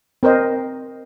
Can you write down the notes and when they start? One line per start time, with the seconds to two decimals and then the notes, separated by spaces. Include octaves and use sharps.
0.23 C4 A#4 C5 D#5